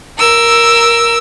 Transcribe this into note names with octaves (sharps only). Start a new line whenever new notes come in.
A#4 E6